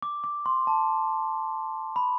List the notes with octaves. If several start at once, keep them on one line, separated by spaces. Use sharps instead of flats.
D6
D6
C6
A5
B5